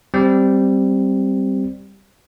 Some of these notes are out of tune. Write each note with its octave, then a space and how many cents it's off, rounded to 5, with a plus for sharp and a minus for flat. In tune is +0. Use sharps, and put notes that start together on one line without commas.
G3 +0 C4 +0